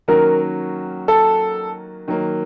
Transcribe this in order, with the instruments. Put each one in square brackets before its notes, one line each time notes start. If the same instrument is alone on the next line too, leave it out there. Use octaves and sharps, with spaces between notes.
[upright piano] D#3 F#3 A#3 C#4 F#4 [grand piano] A#4
[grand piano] A4
[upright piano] D#3 F#3 A#3